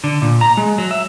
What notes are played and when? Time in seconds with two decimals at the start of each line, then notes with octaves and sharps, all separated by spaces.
0.04 D3
0.22 A#2
0.41 A#5
0.57 G#3
0.78 F#3
0.91 E5